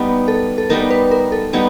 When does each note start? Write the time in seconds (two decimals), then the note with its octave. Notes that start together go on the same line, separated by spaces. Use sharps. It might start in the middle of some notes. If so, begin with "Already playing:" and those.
Already playing: G3 B3 D#4
0.28 A4
0.58 A4
0.70 G3 B3 D#4 A#4
0.90 B4
1.11 A#4
1.32 A4
1.53 G3 B3 D#4